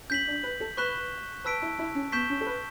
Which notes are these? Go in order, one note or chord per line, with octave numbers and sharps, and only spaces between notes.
C#4 G6 B6 F#7
D4
B4
A4
B4 C#6 F#6 B6 E7 G7
B4 A5 E6 B6 D7
E4
E4
C#4
B3 C#6 G6 B6 E7 G7
C#4
A4
B4